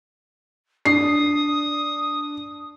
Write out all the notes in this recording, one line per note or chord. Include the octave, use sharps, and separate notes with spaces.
D4 D#6 C7